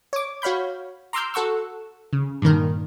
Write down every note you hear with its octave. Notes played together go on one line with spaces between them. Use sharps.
C#5 D6
F#4 C#5 F5 B5 G6
A#5 C6 D6 E6 F6 G6
F#4 A4 F#5 C#6 E6
C#3
G2 A#2 D#3 A#4